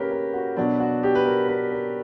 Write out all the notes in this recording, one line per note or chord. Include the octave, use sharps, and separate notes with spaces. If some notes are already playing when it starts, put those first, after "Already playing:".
Already playing: C#3 A#3 G4 A#4 B4 C#5
A#4
F#4
B2 F#3 B3 D4
F#4
G4
B4
A#4
B4
A#4